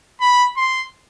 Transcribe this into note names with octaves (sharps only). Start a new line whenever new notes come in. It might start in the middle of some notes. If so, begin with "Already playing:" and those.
B5
C6